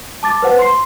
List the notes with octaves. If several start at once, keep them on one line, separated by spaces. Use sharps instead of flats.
A5 D6 A6
B4 C5 F#5
C6 C7